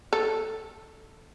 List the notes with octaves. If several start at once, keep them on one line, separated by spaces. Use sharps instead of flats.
A4